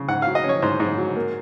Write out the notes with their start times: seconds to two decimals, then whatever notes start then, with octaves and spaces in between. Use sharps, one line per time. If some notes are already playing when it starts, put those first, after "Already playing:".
Already playing: C#3
0.08 G#2 F#5
0.22 F#3 F5
0.35 D#5
0.44 C#4
0.49 C#5
0.62 G#2 C5
0.80 G#2
0.98 F#3
1.16 A#3